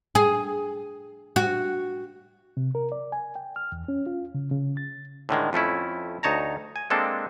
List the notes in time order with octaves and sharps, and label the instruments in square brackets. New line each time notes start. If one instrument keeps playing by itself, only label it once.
[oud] G#4
F#4
[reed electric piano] C3
A#4
D5
G#5
G5
F6
E2
C#4
F4
C#3
C#3
A6
[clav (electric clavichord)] A2 D3 D#3 G#3
F2 A3 C#4 E4
D2 D#4 C#5 A5 A#5
G#5
G#3 A#3 C4 D4 A4